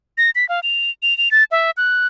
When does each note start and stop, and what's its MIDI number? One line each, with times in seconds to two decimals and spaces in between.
0.18 0.30 94
0.35 0.47 95
0.49 0.60 77
0.63 0.90 101
1.03 1.17 101
1.18 1.31 101
1.31 1.44 93
1.51 1.71 76
1.77 2.07 90